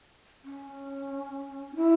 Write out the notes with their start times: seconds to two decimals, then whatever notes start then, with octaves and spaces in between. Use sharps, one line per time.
0.44 C#4
1.75 E4